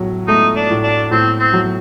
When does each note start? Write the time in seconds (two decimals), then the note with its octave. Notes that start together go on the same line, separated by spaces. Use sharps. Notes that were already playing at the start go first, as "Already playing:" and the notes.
Already playing: A2 F#3
0.28 A3 D#4
0.56 D4
0.70 A2
0.83 D4
1.11 A2 C4
1.40 C4
1.53 F#3